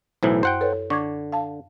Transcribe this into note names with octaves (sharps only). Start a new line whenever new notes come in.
B1 A2 E3 E4 C5
F#2 C5 F#5 G5
A4 B4 C#5
D3 C#6 D6 G#6
F5 A5